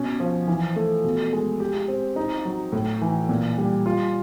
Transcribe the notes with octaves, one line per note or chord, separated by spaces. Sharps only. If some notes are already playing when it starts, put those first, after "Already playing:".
Already playing: B2 C#4
F3
E3
A3
B2
G#3
G4
C4
D#4
F#3
A2
E3
A#2
G3
F4